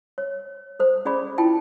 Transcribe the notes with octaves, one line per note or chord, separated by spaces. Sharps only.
C#5
A4 C5
C#4 G#4 D5 B5
E4 F4 G5 A5